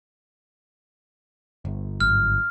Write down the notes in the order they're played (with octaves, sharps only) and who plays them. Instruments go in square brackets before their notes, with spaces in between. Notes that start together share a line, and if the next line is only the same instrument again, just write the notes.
[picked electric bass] G1
[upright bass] G#1 F#3 [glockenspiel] F6